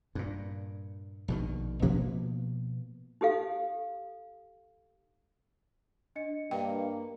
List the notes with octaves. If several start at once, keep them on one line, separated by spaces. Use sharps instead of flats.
G2 A#2
A#1 B2 D#3
B2 F3 A#3 B3
D#4 G4 A4 F5
D4 D#5 C#7
G2 A#3 G5